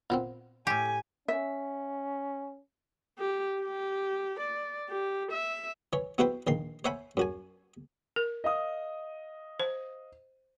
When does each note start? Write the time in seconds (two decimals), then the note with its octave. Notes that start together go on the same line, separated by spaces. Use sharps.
0.10 A#2 B3 C4
0.67 A2 G4 G#5
1.28 C#4 E5
3.18 G4
3.61 G4
4.40 D5
4.89 G4
5.31 E5
5.93 E3 C#5
6.18 B3 E4 F#4 B4 C5 G5
6.47 A#1 D#3 C6
6.85 C5 C#5 E5 F#5 G#5 B5
7.17 F#2 F#4 G#5
8.16 A#4
8.44 D#5 F5 D#6
9.60 C5